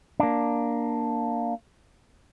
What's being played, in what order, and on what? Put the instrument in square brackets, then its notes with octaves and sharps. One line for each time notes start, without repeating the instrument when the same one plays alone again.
[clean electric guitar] A#3 D4